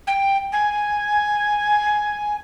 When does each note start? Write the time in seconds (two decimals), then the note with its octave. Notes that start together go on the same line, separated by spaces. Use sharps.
0.06 G5
0.51 G#5